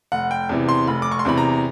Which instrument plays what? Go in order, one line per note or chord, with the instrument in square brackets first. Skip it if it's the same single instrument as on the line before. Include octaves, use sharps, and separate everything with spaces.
[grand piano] F1 F#5
G5
E2 C3 E3
C6
F1 B5
D6
C#6
C6
E2 C3 E3 B5
A#5